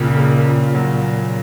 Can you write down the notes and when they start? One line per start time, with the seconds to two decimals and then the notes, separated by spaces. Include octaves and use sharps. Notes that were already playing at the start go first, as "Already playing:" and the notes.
Already playing: C#2 A#2 C#3 A#3
0.16 C#3 A#3
0.45 C#3
0.75 F#3